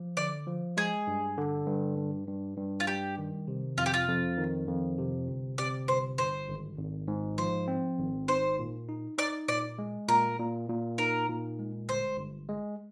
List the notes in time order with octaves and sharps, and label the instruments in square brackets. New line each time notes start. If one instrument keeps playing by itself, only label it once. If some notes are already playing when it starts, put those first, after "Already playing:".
Already playing: [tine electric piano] F3
[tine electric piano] D3 [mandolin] D5
[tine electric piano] F3
[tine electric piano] G#3 [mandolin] G#4
[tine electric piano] G2
D3
G2
G2
G2
G2
[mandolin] F4
[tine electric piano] G3 [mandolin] G4
[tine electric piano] D#3
C3
[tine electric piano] F2 [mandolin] F4
[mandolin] G4
F4
[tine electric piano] F2
D#3
F2
C3
G1
[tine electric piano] C3 [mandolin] D5
[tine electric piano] G1 [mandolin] C5
[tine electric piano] G1 [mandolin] C5
[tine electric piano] G#1
G#1
G#2
[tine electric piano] F3 [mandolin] C5
[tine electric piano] C4
G#1
[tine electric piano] D#4 [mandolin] C5
[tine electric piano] A#2
D#4
[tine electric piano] D#4 [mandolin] D5
[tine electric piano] A#2 [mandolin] D5
[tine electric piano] G#3
[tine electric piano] A#2 [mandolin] A#4
[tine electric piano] A#2
A#2
[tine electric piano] D#4 [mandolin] A#4
[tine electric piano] A#2
G#3
[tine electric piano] G1 [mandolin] C5
[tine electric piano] G1
G#3